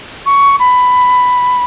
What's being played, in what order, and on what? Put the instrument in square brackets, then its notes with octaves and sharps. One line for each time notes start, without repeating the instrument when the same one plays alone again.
[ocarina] C#6
B5